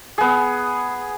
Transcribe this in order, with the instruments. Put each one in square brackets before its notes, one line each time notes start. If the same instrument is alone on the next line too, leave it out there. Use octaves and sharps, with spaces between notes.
[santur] B3 G#4